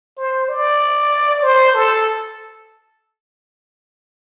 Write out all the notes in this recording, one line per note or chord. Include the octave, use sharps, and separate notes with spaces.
C5
D5
C5
A4